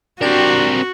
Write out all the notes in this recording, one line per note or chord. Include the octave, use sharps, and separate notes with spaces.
C4 D4 F#4 G4 A#4